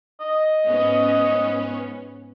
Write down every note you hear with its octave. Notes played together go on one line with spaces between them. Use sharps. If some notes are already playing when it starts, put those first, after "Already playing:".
D#5
G#2 B3 C#4